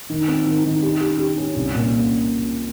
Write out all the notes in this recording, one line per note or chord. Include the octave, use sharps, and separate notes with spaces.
D#3
C4
D#3
D#3
G4
G4
G4
C#4
C2
A#2